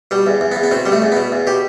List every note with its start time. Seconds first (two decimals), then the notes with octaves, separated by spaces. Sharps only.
0.11 B2 G3
0.27 E2
0.41 E2
0.52 B3
0.56 E2
0.63 B3
0.71 B2 C4
0.85 B2 G3
0.92 A3
1.02 E2
1.12 B2 B3
1.32 E2
1.47 B2 G4